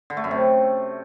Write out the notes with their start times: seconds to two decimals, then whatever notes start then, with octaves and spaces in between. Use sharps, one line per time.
0.10 D3
0.17 A3
0.24 F#2
0.31 C3